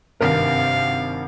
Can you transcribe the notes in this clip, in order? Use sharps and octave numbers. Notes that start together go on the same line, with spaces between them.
G#1 G2 C3 A#4 F5